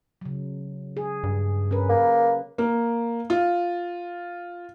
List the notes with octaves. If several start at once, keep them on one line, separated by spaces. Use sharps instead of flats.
C#3 F#3
G#4
G2
C#4 A#4 B4
A#3
A#3
F4